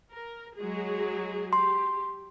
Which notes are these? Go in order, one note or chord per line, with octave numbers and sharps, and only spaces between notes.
A#4
F#3 G#3 G#4
G4 C6